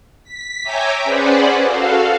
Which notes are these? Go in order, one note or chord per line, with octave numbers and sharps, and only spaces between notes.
B6
C#5 E5 G5 G#5 A#5 D6
C#4 G#4 B4 C5 D5 F#5
F#4 A4 F5